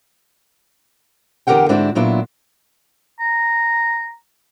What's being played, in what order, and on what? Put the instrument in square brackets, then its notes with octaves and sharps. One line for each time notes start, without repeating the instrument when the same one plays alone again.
[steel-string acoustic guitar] E2 D3 G4 A#4 F#5 G5
G#2 D3 C4 D4 E4 F#4
A#2 F#3 B3 D4 E4 F4
[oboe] A#5